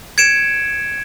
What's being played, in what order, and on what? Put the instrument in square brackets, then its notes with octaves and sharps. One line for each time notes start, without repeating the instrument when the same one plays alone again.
[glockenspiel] G#6 C#7 D7 E7